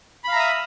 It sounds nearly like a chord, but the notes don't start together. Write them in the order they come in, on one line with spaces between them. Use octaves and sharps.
B5 F5 A#5 E5 D#6